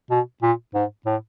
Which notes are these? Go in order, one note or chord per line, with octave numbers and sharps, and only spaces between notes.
B2
A#2
G#2
A2